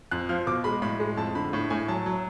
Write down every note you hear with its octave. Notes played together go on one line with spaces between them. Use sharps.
F2 F#6
F3 F6
B2 D6
G#3 B5
A2 B5
G#3
F2 A5
D3 B5
A2
A2 G#5
F#3 A5
F#3